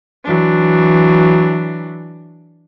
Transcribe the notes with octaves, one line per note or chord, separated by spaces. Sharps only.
E3 F#3 D4